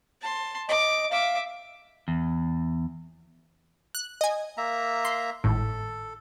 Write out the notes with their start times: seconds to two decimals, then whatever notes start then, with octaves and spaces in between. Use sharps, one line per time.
0.21 A5 C6
0.68 D#5 D6
1.11 E5 F5 D6
2.08 E2
3.95 F#6
4.21 D#5 G#5
4.57 A#3 E5 A#5
5.05 C6
5.44 G#1 A2 A4